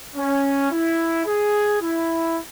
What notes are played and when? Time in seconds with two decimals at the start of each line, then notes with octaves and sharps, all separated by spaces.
0.16 C#4
0.71 E4
1.26 G#4
1.81 E4